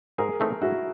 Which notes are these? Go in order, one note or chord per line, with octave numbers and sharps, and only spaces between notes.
G#2 G#4 A#4
E3 A3 C4 D#4
G#2 E4 F#4